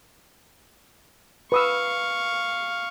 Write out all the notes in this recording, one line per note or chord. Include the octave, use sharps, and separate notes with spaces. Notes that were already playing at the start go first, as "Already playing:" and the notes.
B4 F5 C#6 D#6 E6